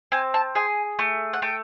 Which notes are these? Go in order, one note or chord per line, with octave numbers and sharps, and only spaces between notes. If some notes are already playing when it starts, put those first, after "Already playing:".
C4 G#5
A5
G#4 G#5
A3
F#5
A3 G5